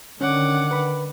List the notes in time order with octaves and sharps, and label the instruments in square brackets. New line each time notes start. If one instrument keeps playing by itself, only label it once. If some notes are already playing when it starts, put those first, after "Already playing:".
[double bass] D3 D#3 [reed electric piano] C#4 C#5 [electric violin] F#5 D6
[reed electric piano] B4 B5